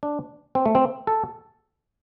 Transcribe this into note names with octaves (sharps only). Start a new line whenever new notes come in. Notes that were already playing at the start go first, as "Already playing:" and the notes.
D4
C4
A3
C4
A4